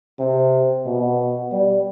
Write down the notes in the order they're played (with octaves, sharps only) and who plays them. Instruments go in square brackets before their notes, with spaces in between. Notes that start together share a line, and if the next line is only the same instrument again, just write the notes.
[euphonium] C3
B2
G3